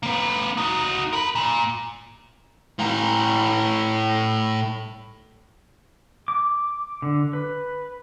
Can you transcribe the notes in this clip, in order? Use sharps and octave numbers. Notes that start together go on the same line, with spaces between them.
A#3 B4
D#4 F#4
A#4 B5
A#2
A2 A#5
D6
D3
B4